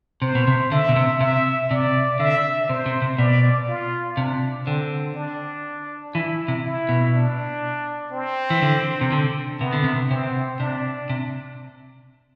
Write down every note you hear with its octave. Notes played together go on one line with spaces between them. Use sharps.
C3 C5
B2
C3
D3 E5
B2
C3
C3 E5
C3 D5
D3 E5
C3 C5
C3
C3
B2 D5
F4
C3 D4
D3 C4
D4
E3 E4
C3
E4
B2
D4
C4
E3
D3
C3
D3
C3 B3
D3
C3
C3 C4
C3 D4
C3